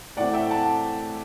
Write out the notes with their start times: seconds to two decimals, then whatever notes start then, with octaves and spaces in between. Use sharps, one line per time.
0.16 A2 E3 A3 C4 D5 F#5
0.33 E5 G5
0.50 F#5 A5